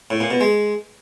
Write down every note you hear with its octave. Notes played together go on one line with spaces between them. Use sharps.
A2
A#2
B2
G#3